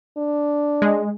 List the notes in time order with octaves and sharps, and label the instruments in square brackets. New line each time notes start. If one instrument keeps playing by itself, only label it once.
[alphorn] D4
[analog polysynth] G#3